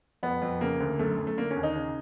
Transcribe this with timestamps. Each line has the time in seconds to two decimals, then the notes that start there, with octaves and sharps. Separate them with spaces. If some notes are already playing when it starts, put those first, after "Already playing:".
0.23 F2 B3
0.42 F2
0.61 C#3 A#3
0.80 D2
0.99 F#2 A3
1.18 F#2
1.27 A3
1.37 D3 A#3
1.51 C#4
1.56 D#2
1.63 D#4
1.76 C#3